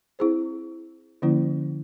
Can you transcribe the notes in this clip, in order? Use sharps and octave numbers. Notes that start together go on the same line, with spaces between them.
C4 E4 G#4 C5
D3 F3 A#3 C#4 E4